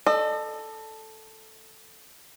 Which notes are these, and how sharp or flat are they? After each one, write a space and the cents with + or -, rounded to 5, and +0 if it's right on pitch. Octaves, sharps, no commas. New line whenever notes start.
A4 +0 D#5 -45